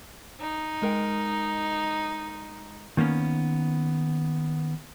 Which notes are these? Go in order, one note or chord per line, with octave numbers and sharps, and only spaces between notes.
D#4
G#3 A#4 G5
D#3 A#3 B3 C#4